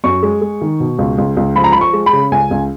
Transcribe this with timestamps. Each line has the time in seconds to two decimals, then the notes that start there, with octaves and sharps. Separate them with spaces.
0.04 F#2 C#6
0.23 G#3
0.42 G#3
0.61 D#3
0.80 B2
0.99 C#2
1.18 C#2
1.37 C#2
1.56 F3 B5
1.64 A#5
1.73 B5
1.75 F3
1.81 C#6
1.93 G#3
2.06 B5
2.13 C#3
2.32 C#2 G#5
2.51 C#2